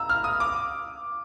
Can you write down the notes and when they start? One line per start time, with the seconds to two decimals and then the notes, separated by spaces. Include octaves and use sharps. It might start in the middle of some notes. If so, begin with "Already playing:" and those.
Already playing: A#5 E6
0.10 F6
0.24 D#6
0.40 D6